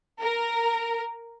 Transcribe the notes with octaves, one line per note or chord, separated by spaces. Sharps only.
A#4